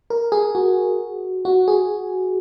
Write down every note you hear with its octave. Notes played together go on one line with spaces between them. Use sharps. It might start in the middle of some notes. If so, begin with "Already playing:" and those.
A#4
G#4
F#4
F#4
G#4